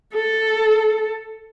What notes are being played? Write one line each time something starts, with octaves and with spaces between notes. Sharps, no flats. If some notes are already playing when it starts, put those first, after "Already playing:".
A4